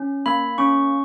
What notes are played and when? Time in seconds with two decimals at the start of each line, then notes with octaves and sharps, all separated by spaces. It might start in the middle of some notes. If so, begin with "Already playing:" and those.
Already playing: C#4
0.26 A#3 B5
0.58 C#4 C#6